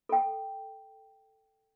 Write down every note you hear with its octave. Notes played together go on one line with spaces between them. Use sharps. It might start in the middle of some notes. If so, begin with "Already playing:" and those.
A4 G5